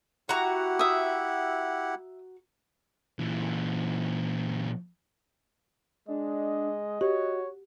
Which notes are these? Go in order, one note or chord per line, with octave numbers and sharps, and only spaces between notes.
E4 F#4 G4 F#5 A#5
E5 D#6
A#2 E3
G#3 D4 D#5
F#4 G4 C#5